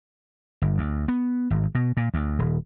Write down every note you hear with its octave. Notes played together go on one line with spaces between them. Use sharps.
G1
D2
B3
G#1
B2
A#2
D2
D#1